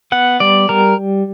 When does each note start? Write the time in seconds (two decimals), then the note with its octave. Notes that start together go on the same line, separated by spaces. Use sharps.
0.12 B3 F#5
0.40 G3 D5
0.69 G3 A#4